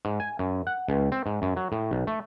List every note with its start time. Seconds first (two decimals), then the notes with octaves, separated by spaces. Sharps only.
0.05 G#2
0.20 G#5
0.39 F#2
0.67 F#5
0.88 C#2
1.12 C4
1.26 G#2
1.42 F#2
1.56 F#3
1.72 A2
1.91 B1
2.07 A3